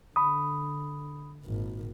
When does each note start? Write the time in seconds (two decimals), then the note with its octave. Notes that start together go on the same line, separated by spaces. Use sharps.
0.16 D3 B5 D#6
1.45 G#1 A#2